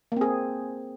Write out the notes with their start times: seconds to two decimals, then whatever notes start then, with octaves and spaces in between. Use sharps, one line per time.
0.12 A#3
0.17 C4
0.21 G#4